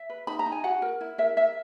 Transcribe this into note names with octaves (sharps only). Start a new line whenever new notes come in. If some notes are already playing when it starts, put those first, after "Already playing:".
Already playing: E5
B4
D#4 B5
A#5
D#4
G#5
F#4 F#5
A#4
E4
A#4 E5
A#4 E5